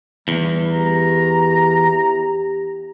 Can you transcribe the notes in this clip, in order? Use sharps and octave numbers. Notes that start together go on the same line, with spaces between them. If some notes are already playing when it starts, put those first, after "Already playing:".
E2 G3
G4 A#5